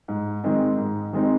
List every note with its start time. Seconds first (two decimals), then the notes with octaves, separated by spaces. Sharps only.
0.08 G#2
0.44 D#3 G#3 C4 D#4
0.78 G#2
1.13 D#3 G#3 C4 D#4